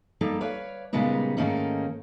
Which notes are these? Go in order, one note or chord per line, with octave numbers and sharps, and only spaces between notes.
G3 A#3 D#4 A4
B4 C#5 D5 F5
A#2 C#3 G3 G#3 B3 D#4
G#2 D#3 A3 A#3 C#4 D#4